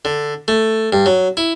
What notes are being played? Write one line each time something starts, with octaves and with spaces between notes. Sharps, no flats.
D3
A3
G2
F#3
E4